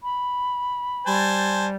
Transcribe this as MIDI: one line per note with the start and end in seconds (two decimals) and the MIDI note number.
0.03 1.18 83
1.06 1.76 55
1.06 1.67 72
1.06 1.67 80
1.06 1.67 81